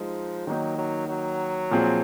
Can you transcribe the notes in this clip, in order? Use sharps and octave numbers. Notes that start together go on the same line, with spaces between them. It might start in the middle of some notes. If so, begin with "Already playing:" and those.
Already playing: F3 G#3 D#4
D#3 F#3 A#3 D#4
F#3
F#3
A#2 F3 C4 F4 G#4